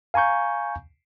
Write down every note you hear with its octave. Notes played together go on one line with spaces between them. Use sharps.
F5 G#5 A#5 C#6 G6